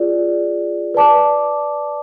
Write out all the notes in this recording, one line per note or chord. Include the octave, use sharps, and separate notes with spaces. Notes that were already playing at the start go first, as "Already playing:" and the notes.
Already playing: F4 G#4 D5
B4 D5 A5 D6